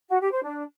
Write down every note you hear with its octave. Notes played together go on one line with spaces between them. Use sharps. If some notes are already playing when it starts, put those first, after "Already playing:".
F#4
G4
C5
D4